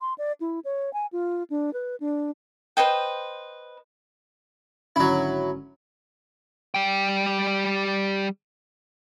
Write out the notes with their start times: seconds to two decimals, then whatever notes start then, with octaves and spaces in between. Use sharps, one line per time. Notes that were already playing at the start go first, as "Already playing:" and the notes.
0.01 C6
0.18 D5
0.41 E4
0.65 C#5
0.93 G#5
1.13 F4
1.50 D4
1.73 B4
2.00 D4
2.77 B4 C5 D#5 G5
4.96 G#1 D3 F#3 C#4 E4
6.75 G3 G5